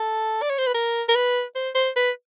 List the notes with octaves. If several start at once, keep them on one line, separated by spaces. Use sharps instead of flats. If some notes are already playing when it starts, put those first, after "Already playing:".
Already playing: A4
D5
C#5
C5
B4
A#4
A#4
B4
C5
C5
B4